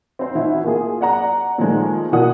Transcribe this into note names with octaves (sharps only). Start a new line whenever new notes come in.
C4 C5
E3 D#4 E4 F#4
A#3 F4 G#4
D5 F#5 A#5
A#2 D#3 F3 G#3 A3
B2 E3 A#3 D5 F#5 D#6